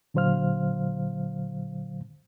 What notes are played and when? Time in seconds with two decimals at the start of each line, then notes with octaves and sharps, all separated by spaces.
0.14 A#2 D3 F#3 C5 F5 F6